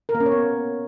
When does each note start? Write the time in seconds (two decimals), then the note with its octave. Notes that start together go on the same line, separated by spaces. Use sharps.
0.09 A#4
0.15 A#3
0.20 C#4
0.26 C#5
0.32 B3